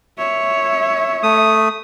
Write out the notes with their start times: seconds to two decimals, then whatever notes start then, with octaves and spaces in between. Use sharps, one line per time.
0.18 C#5 E5
1.23 A3 D#6